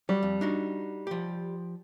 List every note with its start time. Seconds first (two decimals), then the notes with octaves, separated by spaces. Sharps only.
0.09 F#3 G3
0.23 F2
0.41 D4 D#4 F#4
1.07 F3 G4